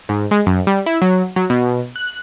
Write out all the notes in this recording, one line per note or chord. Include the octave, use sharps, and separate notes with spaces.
G#2
G#3
F#2
G3
E4
F#3
F#3
B2
F#6